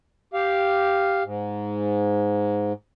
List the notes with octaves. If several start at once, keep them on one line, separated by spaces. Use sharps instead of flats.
G4 F5
G#2